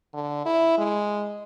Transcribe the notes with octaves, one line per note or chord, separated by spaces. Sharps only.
D3
E4
G#3